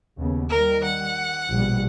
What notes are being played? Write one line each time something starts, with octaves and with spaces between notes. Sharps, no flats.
D#2 C#3 B3
D#3 G3 A#4
F#5
A#1 B2 G3